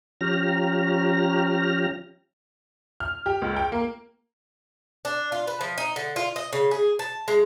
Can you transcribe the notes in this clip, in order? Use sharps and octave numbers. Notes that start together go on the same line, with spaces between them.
F3 C#4 G4 A#5 F6
F6
G4
C#2
G5
A#3
D4
F4
B4
F3
D#4
D3
F4
D#5
C#3
G#4
A5
G#3